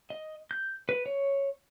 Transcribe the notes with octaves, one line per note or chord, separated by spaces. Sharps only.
D#5
G6
B4
C#5